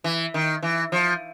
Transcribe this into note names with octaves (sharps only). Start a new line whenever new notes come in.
E3
D#3
E3
F3